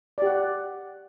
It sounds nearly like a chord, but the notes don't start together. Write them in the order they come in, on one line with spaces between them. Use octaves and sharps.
D5 G4 F#5